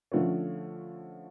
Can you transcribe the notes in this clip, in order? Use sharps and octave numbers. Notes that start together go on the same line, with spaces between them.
D3 F3 A3 C#4